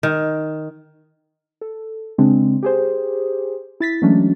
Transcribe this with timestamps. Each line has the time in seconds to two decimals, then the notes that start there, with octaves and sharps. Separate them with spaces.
0.03 D#3
1.61 A4
2.18 C#3 G#3 C4 D4
2.63 G4 G#4 C5
3.80 E4 A6 B6
4.02 E3 F#3 G#3 A3 C#4 D4